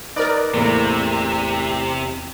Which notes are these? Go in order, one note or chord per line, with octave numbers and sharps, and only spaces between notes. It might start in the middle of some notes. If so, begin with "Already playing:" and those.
D#4 A#4 B4 D5 D#5
E2 A2 C3 A#3